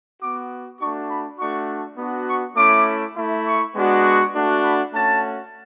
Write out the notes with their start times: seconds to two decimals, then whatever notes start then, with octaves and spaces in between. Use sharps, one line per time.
0.20 B3 F#4 D6
0.79 A3 D4 F#4 C#6
1.09 B5
1.38 A3 D4 F#4 C#6
1.98 B3 D4 F#4
2.27 C#6
2.56 A3 C#4 E4 D6
3.16 A3 E4
3.45 C#6
3.75 G#3 B3 D4 F#4
4.04 C#6
4.34 A3 D4 F#4
4.63 B5
4.93 A3 C#4 F#4 A5